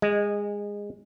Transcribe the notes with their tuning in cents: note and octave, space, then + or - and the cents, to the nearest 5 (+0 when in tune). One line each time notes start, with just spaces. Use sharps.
G#3 -20 D#5 +0